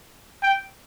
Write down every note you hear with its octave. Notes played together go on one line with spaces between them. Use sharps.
G5